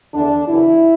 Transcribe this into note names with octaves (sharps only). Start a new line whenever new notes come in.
E2 D3 D4
F#2 C#3 E3 E4